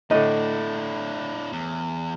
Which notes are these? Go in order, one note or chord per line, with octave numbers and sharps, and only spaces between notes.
A2 D3 D4 E4 D#5
E2